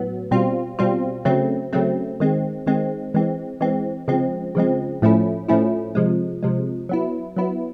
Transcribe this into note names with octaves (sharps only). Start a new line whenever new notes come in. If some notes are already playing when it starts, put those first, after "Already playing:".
Already playing: A2 F#3 B3
B2 G3 C4 F4
B2 G3 C4 F4
C#3 F#3 A3 C4
C#3 F#3 A3 C4
D#3 G#3 C4
D#3 G#3 C4
E3 G#3 C4
E3 G#3 C4
C#3 F3 G#3 C4
C#3 F3 G#3 C4
A2 F3 A3 C#4 E4
A2 F3 A3 C#4 E4
C3 F3 G#3
C3 F3 G#3
F#3 B3 E4
F#3 B3 E4